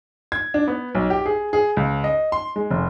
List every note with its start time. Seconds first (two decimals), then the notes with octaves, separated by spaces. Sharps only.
0.32 G#6
0.54 D4
0.68 B3
0.95 B1
1.10 G4
1.26 G#4
1.53 G#4
1.77 C#2
2.04 D#5
2.32 C6
2.56 G#3
2.70 F1